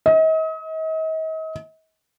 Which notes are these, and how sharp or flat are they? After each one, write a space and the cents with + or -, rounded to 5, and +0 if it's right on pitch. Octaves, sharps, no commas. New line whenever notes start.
D#5 +40